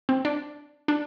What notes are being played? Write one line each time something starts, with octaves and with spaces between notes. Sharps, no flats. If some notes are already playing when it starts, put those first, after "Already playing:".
C4
D4
D4